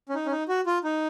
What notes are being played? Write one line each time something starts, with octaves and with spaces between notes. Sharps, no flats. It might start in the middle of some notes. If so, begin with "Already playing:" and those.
C#4
D#4
C#4
D#4
F#4
F4
D#4